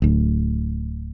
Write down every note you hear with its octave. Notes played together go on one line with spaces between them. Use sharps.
D1 D2